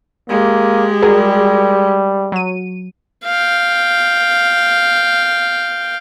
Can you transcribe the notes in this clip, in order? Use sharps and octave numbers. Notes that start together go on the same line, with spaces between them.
G#3 A#3 G4
G3 F#4 G#4 A#4
F#3 D#7
F5 G5